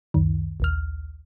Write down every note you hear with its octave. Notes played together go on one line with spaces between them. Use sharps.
C#2 F#2 D#3
A#1 D#2 F6